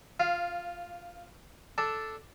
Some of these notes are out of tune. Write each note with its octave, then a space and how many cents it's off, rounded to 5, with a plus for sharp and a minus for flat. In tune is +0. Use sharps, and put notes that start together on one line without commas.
F4 +5 F5 -15
D4 +0 A4 +0